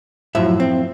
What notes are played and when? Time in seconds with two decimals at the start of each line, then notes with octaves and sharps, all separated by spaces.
0.35 F#2 A2 F3 E5
0.60 C4